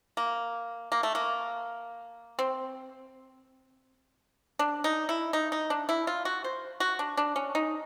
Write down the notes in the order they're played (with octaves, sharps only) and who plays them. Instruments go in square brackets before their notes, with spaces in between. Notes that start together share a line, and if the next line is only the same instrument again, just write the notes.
[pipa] A#3
A#3
A3
A#3
C4
D4
D#4
E4
D#4
D#4
D4
E4
F4
F#4
C5
F#4
D4
D4
C#4
D#4